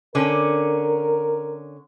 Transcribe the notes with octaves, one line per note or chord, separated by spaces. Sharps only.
D3 C#4 A#4